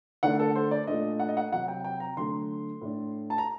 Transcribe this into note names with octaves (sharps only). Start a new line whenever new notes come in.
D3 A3 D4 F#5
A4
C5
D5
A#2 A3 D4 D#5
F#5
D#5
F#5
C3 F#3 C4 F#5
G5
G5
A#5
D3 F#3 A3 D4 C6
A2 A3 D4
A5
A#5